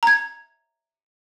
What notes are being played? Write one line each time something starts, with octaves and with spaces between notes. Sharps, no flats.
A#5 G#6